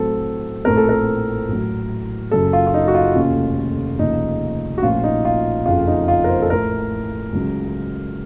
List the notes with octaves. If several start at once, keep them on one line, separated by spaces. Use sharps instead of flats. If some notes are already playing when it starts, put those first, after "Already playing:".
Already playing: A2 F#3 C4 A4
A#1 A2 A3 C4 A#4
A4
A#4
A1 A2 F#3
F#1 F#2 C#3 F#3 A4
F4
F4
D#4
F#4
F4
F1 D#2 C#3 A3 C#4
F1 D#2 C#3 F3 D#4
F#4
A#1 A2 F3 A#3 C#4 F4
D#4
F4
F#1 F2 C#3 F4
D#4
F4
A#4
C5
A4
A1 A2 A3 A#4
C#2 C#3 F#3